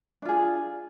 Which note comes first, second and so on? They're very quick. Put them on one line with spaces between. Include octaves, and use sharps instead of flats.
D4 F4 G#4